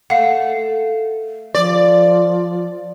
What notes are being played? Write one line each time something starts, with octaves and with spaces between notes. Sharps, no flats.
A3 F5 F#5
F3 D5